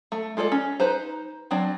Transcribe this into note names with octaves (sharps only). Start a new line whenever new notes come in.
A3
G#3 F4 A4 C5 D5
C#4
D#4 B4 C5 A#5
F#3 C4 D4 D5